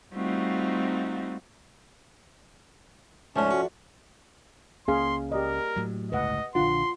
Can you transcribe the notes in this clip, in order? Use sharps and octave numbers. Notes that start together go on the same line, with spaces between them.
G3 A3 C4 D#4 F4 F#4
C#2 G#2 F3 A3 C#4 D4
F#4
C#2 A#3 C#4 G#4 F5 C6
G4 A#4 D5 D#5
A2 F#3
G1 C#2 A2 B4 D#5 F#5
A#1 D3 D4 F4 F#5 C6